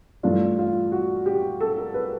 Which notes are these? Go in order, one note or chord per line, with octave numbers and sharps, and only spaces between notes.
G2 E3 A3 D4 F4
F4
F#4
G4
A4
A#4
B4